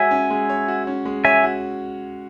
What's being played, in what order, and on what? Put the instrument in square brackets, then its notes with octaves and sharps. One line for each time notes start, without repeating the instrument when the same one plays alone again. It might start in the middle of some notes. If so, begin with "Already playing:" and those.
Already playing: [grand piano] G#3 F#4 C#5 [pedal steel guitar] E5 G#5
[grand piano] C#4
G#3
C#5
F#4
C#4
G#3
[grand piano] C#5 [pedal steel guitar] E5 G#5
[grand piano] F#4